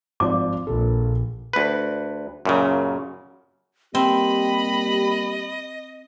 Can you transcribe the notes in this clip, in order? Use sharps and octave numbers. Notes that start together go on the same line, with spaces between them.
G#1 F3 D5 D6
A#1 A4
D2 B4
F#2 A#2 C#3
G3 A#3 C4 G4 D#5 B5